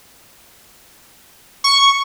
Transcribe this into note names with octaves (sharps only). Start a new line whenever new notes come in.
C#6